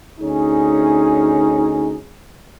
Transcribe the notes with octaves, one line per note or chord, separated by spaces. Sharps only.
D2 C#4 D#4 G#4